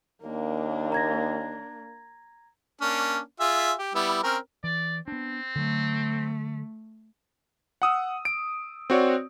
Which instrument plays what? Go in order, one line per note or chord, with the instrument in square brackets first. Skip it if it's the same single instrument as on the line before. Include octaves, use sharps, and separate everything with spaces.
[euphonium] D#2 [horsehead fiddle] A#3 D4
[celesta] A#5 G#6 A#6
[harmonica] A#3 C#4 D4
F4 G#4 E5
G4
G3 B3 E4
C4 C#4 A#4
[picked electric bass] E3 [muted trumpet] D5
[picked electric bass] B3 D4 [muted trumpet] C4
[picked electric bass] D3 F#3 [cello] A3
[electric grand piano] F#5 D#6 E6
D7
C4 F#4 C#5 D5